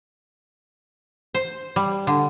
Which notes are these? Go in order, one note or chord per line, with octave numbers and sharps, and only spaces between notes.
C5
G3
D3